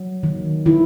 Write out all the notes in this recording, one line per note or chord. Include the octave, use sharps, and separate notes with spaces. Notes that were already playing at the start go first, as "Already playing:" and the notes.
Already playing: F#3
D#3
D#3 E4